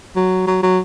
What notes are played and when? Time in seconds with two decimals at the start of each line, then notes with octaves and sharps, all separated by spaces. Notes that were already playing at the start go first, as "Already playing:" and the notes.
0.16 F#3
0.47 F#3
0.63 F#3